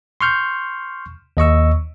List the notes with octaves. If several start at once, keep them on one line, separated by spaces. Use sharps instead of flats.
C6 C#6 F6 G6
D#2 D#5 C#6 E6